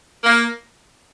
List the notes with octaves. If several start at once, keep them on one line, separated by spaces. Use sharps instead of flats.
A#3